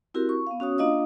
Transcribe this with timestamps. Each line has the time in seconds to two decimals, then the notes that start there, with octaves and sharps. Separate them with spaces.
0.14 C4 E4 F#4 G4 A#4
0.29 C#6
0.47 B3 F5
0.60 C#4 F#4 C#5 D#6
0.78 A#3 D4 F4 D#5 F5 D#6